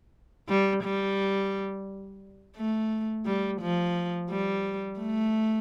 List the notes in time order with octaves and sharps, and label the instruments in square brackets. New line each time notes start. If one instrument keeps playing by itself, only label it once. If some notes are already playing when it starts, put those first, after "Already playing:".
[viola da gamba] G3
G3
A3
G3
F3
G3
A3